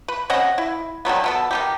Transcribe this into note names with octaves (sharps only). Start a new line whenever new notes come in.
B4
C4 C#4 D#5 F#5
E4
D3 D#3 F#3 B3
B2 B3 A4
D#3 D#4 G4